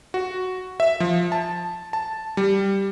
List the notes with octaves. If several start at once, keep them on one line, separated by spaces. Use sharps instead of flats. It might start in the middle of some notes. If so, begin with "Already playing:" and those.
F#4
E5
F3
A5
A5
G3